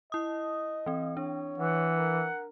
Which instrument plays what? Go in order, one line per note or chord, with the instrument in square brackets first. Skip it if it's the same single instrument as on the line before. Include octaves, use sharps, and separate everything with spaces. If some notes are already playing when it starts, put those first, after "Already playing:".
[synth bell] E4 D#6 [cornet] D#5
[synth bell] E3 C4
[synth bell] D4 [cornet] C#5
[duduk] E3 [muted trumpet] F#5
[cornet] A#4